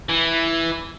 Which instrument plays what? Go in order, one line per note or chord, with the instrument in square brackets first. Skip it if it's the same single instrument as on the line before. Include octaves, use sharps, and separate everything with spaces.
[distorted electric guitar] E3